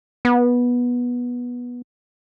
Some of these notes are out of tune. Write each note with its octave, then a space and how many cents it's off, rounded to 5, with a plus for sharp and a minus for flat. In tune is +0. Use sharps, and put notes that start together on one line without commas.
B3 -15